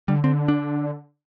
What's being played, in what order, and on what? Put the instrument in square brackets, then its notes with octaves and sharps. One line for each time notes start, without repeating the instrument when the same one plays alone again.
[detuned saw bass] D3 [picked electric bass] G3
[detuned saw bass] D3 [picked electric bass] C4
[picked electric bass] D4